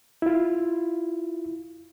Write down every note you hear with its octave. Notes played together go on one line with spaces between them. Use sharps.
E4 F4